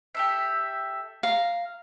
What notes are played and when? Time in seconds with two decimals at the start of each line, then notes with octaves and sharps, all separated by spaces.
0.15 G4 A4 E5
1.23 F5 A#5